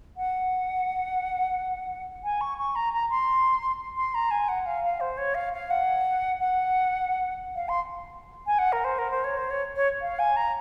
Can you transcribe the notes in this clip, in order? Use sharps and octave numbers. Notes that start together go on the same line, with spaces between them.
F#5
G#5
C#6
C#6
A#5
A#5
C6
C6
A#5
G#5
F#5
F5
F5
C5
C#5
F5
F5
F#5
F#5
F5
C6
G#5
F#5
A#4
C5
A#4
C5
C#5
C5
C#5
C#5
F5
G#5
A#5